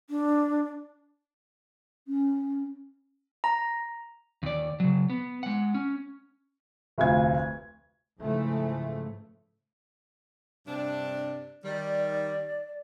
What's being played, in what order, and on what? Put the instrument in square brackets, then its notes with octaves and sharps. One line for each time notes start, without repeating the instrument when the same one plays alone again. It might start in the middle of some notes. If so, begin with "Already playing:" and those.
[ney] D4
[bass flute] C#4
[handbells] A#5
[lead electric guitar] D#2 D5
C#3 F#3
B3
G#3 F#5
C#4
[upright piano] F1 D2 F4 G#6
[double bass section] G#2 C#3 E3 F3 A3
[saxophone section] G2 C3 D4
[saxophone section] D#3 G3 [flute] D5